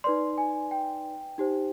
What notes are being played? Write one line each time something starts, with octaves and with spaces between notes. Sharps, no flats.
D#4 B4 D5 C6
G#5
G5
D#4 G4 C5